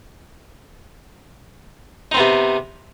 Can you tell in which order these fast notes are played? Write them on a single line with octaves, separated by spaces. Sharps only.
D#4 C4 B3 C3